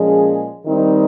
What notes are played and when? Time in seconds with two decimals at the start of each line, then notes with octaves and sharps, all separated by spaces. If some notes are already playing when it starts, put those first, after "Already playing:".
Already playing: A#2 F3 G#3 C#4 G#4
0.66 D#3 G3 C4 D#4